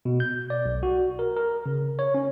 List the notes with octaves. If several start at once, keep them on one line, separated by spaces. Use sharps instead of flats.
B2
G6
D5
B1
F#4
A#4
A#4
C#3
C#5
C#4